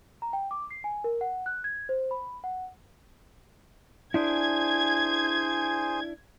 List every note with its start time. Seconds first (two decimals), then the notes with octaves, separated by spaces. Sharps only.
0.22 A#5
0.33 G5
0.51 D6
0.70 C7
0.84 G#5
1.04 A#4
1.21 F#5
1.46 F#6
1.64 G#6
1.89 C5
2.11 B5
2.44 F#5
4.14 D4 E4 G#4 C5 G#5 G#6